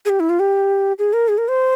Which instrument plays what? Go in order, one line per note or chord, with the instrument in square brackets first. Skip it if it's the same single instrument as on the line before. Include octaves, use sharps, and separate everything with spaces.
[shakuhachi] G#4
G4
E4
F4
G4
G#4
A#4
G#4
A#4
C5